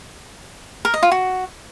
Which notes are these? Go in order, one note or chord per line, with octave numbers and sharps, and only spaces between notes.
A#4
D#5
F4
F#4